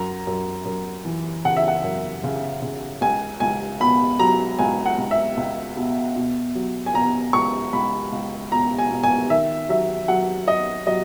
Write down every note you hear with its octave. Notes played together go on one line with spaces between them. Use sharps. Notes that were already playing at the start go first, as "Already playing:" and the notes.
Already playing: F#2 A#5
F#2
F#2
E3
C#3 F#5
E5
F#5
F#2
C#3
C#3
C#2 G#5
C#2 G#5
B2 B5
F#3 A#5
C#2 G#5
F#5
C#2
E5
C#2
B2
B2
F#3
G#5
B2 A#5
C#2 C#6
C#2 B5
C#2
B2 A#5
G#5
B2
G#5
D#3 E5
F#3 E5
F#3 F#5
F#3 D#5
F#3 D#5